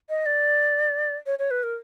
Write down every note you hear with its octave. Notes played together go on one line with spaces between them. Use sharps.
D#5
D5
C#5
C#5
B4
A#4